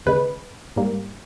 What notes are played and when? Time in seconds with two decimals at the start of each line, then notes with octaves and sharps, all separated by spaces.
0.06 D#2 C#3 G#3 B4
0.76 G#2 G3 A#3